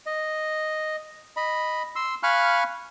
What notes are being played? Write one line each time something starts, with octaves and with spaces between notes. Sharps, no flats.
D#5
D#5 B5
C6 E6
F5 G#5 B5 C#6 F6 F#6